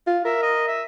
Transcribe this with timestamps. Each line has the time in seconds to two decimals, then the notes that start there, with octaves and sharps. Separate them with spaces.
0.07 F4
0.25 A#4 E5
0.42 D#5
0.67 E5